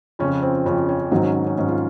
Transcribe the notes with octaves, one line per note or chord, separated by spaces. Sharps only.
F2 C#3 F3 C#4
C4
F2 C#3 F3 C#4
C#4
G#2 D#3 F#3 C4
C#4
C#4
C#4
G#2 D#3 F#3 C#4
F4